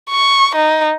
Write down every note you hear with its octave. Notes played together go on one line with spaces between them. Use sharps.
C#6
D#4